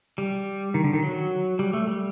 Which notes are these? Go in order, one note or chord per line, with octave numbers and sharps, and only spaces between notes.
G3
D#3
D3
D#3
F#3
G3
A3
G3